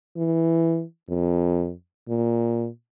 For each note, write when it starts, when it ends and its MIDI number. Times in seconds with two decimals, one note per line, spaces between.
0.17 0.83 52
1.09 1.72 41
2.09 2.68 46